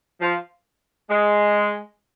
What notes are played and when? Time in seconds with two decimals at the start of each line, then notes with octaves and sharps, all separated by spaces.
0.21 F3
1.10 G#3